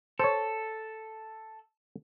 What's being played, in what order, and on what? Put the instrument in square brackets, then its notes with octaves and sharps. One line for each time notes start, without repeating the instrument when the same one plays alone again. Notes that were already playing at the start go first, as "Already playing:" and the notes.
[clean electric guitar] A4 [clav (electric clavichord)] C5 C#5